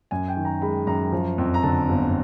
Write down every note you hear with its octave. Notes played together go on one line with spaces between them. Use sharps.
F#2 G#5
G5
D#3
A#5
G#3 B5
F#2 A#5
F3
F2
A#5
D3 A5
G1